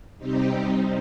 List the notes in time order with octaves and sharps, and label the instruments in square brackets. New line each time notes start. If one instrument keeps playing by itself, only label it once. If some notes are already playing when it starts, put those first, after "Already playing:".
[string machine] C3 G3 C4 D#4 G4